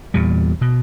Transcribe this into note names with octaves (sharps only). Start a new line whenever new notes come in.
E2 A#2 G3
B2